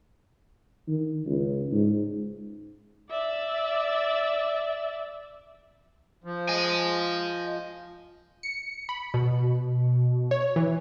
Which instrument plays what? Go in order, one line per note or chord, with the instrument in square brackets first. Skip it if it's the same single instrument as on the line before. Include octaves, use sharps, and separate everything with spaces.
[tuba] D#3
C#2
G#2
[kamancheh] D5 E5
[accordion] F3
[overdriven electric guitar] D#5 G#5
[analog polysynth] C#7
B5
B2
C#5
E3